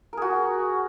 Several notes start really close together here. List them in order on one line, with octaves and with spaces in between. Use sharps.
A#4 G#4 F#4